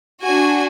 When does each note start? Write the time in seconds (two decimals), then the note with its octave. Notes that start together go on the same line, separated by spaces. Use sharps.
0.22 D4 F#4 G#5